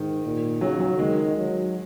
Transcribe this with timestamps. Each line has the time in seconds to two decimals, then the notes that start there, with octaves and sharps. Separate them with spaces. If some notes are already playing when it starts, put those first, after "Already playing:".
Already playing: G#2 D#3
0.24 A#2
0.61 C#3 F#3
0.80 F#3
0.99 D#3 G#3
1.37 F#3